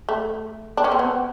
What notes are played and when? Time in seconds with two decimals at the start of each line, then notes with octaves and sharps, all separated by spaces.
0.09 A3
0.77 D4
0.84 C#4
0.92 C4
0.99 B3